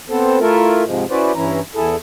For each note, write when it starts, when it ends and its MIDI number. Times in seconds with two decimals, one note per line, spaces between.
0.10 0.39 59
0.10 0.39 60
0.10 0.39 69
0.10 0.39 72
0.40 0.84 57
0.40 0.84 64
0.40 0.84 65
0.40 0.84 69
0.40 0.84 70
0.86 1.05 44
0.86 1.05 48
0.86 1.05 53
0.86 1.05 56
1.10 1.32 61
1.10 1.32 64
1.10 1.32 66
1.10 1.32 71
1.10 1.32 72
1.10 1.32 74
1.35 1.60 43
1.35 1.60 52
1.35 1.60 61
1.35 1.60 64
1.35 1.60 82
1.75 1.96 40
1.75 1.96 64
1.75 1.96 68
1.75 1.96 69